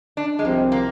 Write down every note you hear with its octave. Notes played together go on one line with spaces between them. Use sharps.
D4
G#3
C2 C3 F3 A#3 C4 G4
A#3